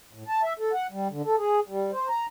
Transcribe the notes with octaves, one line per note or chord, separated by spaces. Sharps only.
A2
A5
E5
A4
F#5
G3
D3
A4
G#4
G3
C5
A#5